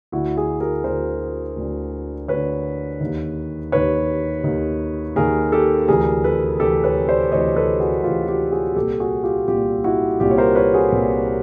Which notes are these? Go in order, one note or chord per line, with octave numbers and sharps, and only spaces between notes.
D2 D3 E4 F#4
F#4 G#4
G#4 A#4
D2 D3 A#4 C5
D2 D3
D2 D3 B4 C#5
D#2 D#3
D#2 D#3 B4 C#5
D#2 D#3
D#2 D#3 G#4 A#4
G4 A4
D2 C3 E3 G#4 A#4
A4 B4
D2 C3 E3 G4 A4
B4 C#5
C5 D5
D2 C3 E3 C#5 D#5
A4 B4
F#4 G#4
D2 C3 E3 F4 G4
F4 G4
F#4 G#4
C2 A#2 G4 A4
F#4 G#4
F4 G4
C2 A#2 F4 G4
E4 F#4
C2 A#2 F4 G4
C#5
A#4 C5
B4 C#5
F#4 G#4
C2 A#2